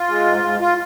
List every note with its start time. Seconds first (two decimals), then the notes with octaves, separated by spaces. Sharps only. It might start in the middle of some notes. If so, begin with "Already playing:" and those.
Already playing: F4
0.09 G#3
0.25 G#2
0.43 G#2
0.60 F4